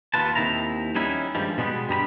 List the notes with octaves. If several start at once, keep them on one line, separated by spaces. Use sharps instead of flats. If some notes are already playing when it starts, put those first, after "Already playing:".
D#2 B3 F4 B4 A5
D#2 D#3 C4 E4 A#5
G3 B3 C#4 D#4 E4
G2 D#3 F3 G3 G#3
B2 G3 G#3 B3
G2 G3 A#5 B5